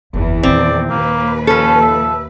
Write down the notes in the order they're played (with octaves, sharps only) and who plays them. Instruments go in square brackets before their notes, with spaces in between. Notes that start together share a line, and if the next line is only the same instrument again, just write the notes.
[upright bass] F#1 [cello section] E2 E3
[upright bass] A#2 D#3 [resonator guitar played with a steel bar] C4 [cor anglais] D5
[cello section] D#2 B4 [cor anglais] A#3
[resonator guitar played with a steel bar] F3 A4 [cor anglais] C#4
[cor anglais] E5